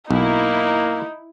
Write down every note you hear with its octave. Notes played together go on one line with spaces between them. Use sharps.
B1 A#3 D#4 E4